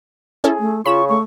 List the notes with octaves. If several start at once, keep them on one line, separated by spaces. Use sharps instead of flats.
C#4 E4 G#4 A4
A3
C#3 F4 B5 C#6 E7
A3 C#6